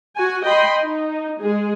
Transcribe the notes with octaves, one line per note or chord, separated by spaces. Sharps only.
F#4 G#5
D#5 G5 B5 C6
D#4
G#3 G#4